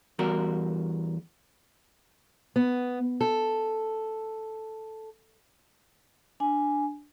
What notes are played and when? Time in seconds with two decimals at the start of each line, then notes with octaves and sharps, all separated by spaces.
0.19 E2 G3 F#4 A#4
2.56 B3
3.21 A4
6.40 D4 G#5